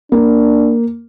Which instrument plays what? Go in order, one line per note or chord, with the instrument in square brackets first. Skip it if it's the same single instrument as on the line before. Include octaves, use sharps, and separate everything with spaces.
[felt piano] A#3 [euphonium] D4